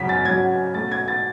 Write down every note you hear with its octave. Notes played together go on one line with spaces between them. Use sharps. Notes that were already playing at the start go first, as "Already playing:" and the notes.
Already playing: F#2 C#3 F#3 C#4 B6
A6
F#2 C#3 F#3 C#4 G#6
B2 A3 C#4 A6
G#6
A6